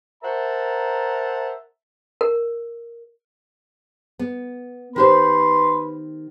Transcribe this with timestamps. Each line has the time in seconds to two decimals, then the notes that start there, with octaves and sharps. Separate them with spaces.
0.23 A#4 C5 E5 F#5 A5 A#5
2.21 A#4
4.19 B3
4.96 D#3 G4 B4 C5 C6